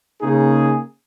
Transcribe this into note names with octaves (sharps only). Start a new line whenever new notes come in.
C#3 A#3 D#4 G#4